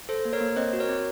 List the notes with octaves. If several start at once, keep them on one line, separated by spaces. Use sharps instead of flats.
A4 C5
A#3
A#4 C#5
A#3
C4 C5 D#5
F#4
A#4 C#5
C4